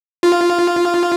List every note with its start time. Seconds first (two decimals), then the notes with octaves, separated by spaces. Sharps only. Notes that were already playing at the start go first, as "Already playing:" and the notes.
0.23 F4